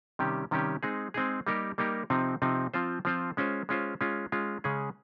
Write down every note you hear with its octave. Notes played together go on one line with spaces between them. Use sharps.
C3 D#3 G3 C#4 G4
C3 D#3 G3 C#4 G4
G#3 C4 D#4 G#4
G#3 C4 D#4 G#4
G3 A#3 D#4 G4 A#4
G3 A#3 D#4 G4 A#4
C3 F3 C4 D#4
C3 F3 C4 D#4
F3 C4 F4 C5
F3 C4 F4 C5
G#3 C#4 F4 C5
G#3 C#4 F4 C5
G#3 C#4 F4
G#3 C#4 F4
C#3 G#3 C#4 G#4